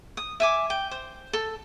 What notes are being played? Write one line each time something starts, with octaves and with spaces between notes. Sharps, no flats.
D#6
E5 G#5 D6
G5
C5
A4